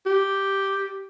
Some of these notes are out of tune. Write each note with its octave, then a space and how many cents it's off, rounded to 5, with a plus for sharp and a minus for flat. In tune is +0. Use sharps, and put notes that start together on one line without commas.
G4 -5